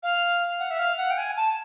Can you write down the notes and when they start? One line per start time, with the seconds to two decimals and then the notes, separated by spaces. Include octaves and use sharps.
0.02 F5
0.59 F#5
0.70 E5
0.79 F5
0.97 F#5
1.10 G5
1.17 G#5
1.36 A5